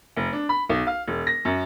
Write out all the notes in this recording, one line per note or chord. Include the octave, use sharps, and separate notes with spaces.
F1
D4
B5
B1
F5
E1
A#6
F#2